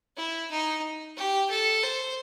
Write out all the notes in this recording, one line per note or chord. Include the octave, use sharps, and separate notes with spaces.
E4
D#4
G4
A4
C5